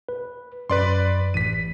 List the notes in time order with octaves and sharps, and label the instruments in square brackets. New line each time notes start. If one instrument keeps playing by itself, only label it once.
[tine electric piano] B4
[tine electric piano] F#2 [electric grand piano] B4 D5 C6
[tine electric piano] A1 [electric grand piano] B6 D#7